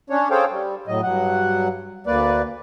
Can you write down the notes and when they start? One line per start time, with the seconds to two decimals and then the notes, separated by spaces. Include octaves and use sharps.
0.10 C#4 D4 C#5
0.31 G#4 A4 C5 C#5 F5 G5
0.51 G3
0.87 A2 F#3 D#5
1.03 G2 F#3 F#5
2.07 D2 A#3 B4 D5